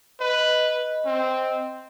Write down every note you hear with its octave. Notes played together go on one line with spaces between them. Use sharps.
B4 D#5
C4